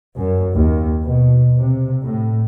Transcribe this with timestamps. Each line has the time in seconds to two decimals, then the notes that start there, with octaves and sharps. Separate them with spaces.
0.17 F#2
0.56 D#2
1.05 B2
1.56 C3
2.04 A2